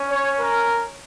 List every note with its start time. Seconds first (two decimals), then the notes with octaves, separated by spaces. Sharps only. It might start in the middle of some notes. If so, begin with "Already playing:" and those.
Already playing: C#4
0.10 C#5
0.39 A#4